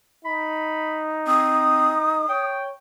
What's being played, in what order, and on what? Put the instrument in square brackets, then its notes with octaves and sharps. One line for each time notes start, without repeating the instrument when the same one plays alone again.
[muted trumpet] D#4 [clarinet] B5
[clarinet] C4 [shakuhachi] D#6
[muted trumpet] C#5 [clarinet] G5